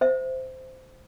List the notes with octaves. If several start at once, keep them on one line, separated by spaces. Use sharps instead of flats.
C5 E5